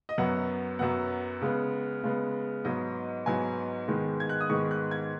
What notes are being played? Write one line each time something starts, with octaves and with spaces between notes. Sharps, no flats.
D#5
F#2 F#3 B3 F#5
F#2 F#3 B3 F#5
C#3 G#3 B3
C#3 G#3 B3
G#2 F#3 B3 D#5
G#2 F#3 B3 G#5
G#2 D#3 G#3 B3
G#6
F#6
D#6
G#2 D#3 G#3 B3 C#6
F#6
G#6